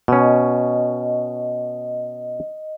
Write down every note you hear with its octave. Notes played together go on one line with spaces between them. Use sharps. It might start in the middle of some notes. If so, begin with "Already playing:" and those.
B2 C#4 D#5